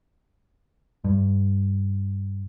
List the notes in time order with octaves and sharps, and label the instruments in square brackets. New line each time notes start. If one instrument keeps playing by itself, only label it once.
[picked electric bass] G2